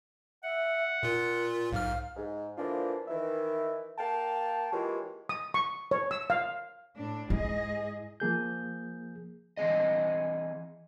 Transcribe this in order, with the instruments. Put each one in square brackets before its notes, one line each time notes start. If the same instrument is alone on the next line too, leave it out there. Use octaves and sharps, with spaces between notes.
[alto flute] E5 [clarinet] F#5
[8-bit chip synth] A#2 F4 [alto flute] A#4
[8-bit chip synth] B1 G#2 F6 [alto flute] F5
[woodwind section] G#2
D3 E3 F3 A#3 D4 F4
D#3 E3 E5
A#3 F5 G5 A5
E3 G#3 A#3 F4 G4 C#5
[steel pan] D#6
C#6
C#5
E6
F5
[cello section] A2 D4
[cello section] G#2 G#4 D#5 [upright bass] E4
[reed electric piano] F3 A#3 G#4 G6
[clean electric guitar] E3 C4 G#4 D#5